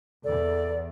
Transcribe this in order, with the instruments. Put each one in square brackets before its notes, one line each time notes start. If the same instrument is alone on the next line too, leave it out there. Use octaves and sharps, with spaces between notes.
[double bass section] E2 [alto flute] A4 [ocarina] D5